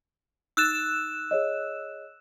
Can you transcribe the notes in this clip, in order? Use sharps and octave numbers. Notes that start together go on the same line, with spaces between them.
D#4 E6 F#6 A6 E7
G#4 C#5 D#5